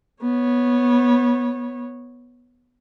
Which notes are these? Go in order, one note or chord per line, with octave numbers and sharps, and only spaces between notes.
B3 C#5